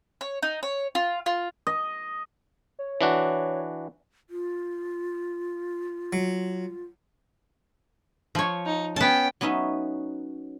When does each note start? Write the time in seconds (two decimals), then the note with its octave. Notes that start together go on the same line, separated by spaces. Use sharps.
0.21 C#5
0.42 D#4
0.63 C#5
0.95 F4
1.26 F4
1.67 D#5
2.79 C#5
3.01 E3 D4 F#4
4.30 F4
6.13 F#3
8.35 F3 C#5
8.66 D#4
8.96 B3 C#4 G5 A5
9.41 F#3 B3 C#4 D#4 E5